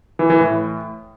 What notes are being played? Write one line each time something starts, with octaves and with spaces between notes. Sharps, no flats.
E3
E3
A2